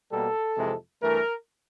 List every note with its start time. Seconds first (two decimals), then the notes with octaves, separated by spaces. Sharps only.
0.11 B2 G3 A#3 A4
0.57 F2 C3 E3 G#3
1.02 G2 E3 A3 A#4